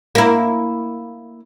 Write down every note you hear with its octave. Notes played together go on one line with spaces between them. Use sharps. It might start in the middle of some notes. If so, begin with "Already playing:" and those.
A#3 E4